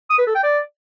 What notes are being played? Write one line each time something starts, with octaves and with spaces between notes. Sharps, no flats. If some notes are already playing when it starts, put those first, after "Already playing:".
D#6
B4
A4
G5
D5